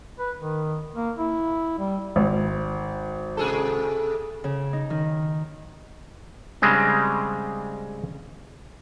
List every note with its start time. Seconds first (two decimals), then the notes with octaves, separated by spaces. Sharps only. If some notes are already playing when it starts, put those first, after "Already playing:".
0.19 B4
0.39 D#3
0.94 A#3
1.18 E4
1.79 G3
2.16 G#1
3.37 C3 G#4 A4
4.44 C#3
4.73 D#4
4.90 D#3
6.62 C#3 G3 G#3 C4 D4